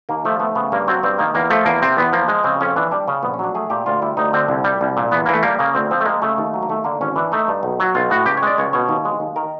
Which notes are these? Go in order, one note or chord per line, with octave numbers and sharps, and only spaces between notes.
D#2 A#3
F3 A3
A3 B3
C#3 B3
G2 A#3
F#3 C4
G2 C4
D#3 A#3
E2 A#3
F3 A3
E2 A#3
C3 C4
E2 B3
F3 A#3
G#3
C#3 C4
F2 C#4
E3 D4
G3 D4
C#3 C#4
A#1 B3
C#4
F#3 D4
A3 G#4
A#2 G4
D2 F4
G3 E4
D2 D#4
D3 C4
C2
G3
C2
A#2
E2 B3
E3 A#3
A3
G3 A#3
C#3 A#3
D2 C4
F3 C4
A3
G#3 A#3
C#3 A3
D#2
F#3
A#3
D#2 A3
D3 A#3
G#1 C#4
E3 D4
A3 D#4
G2
B1
F#3
B1 F4
A2 F#4
C#2 G4
C#5
G#3 D5
C#2 C#5
B2 C#5
D#2
G#3
D#2
D#3 A#4